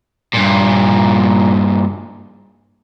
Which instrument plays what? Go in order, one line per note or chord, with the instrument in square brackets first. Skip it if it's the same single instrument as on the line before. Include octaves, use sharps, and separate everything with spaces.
[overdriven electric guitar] G2 A#2